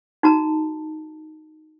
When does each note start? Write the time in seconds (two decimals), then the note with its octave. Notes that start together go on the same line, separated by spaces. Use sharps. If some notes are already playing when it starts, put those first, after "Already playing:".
0.23 D#4 F#4 A5 A#5